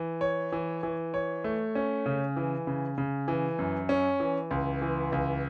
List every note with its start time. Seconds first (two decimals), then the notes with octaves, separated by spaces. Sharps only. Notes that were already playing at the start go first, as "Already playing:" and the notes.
Already playing: E3
0.21 C#5
0.52 E3
0.83 E3
1.14 C#5
1.44 A3
1.75 C#4
2.06 C#3
2.37 E3
2.67 C#3
2.98 C#3
3.28 E3
3.59 F#2
3.89 C#4
4.20 E3
4.51 C#2
4.82 E3
5.12 C#2